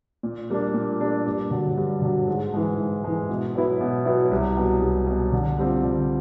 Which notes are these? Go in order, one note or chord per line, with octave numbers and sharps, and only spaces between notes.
A#2
G3 A#3 D4
A#2
G3 A#3 D4
G2
D3 F#3
G2
D3 F#3
G#2
E3 G#3
G#2
E3 G#3
B2
F#3 B3 E4
B2
F#3 B3 E4
C2
B2 F#3
C2
B2 F#3
D3
G3 C4 F4
D3